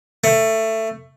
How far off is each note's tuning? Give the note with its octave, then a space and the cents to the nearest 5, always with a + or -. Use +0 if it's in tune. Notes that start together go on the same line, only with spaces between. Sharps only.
A3 +15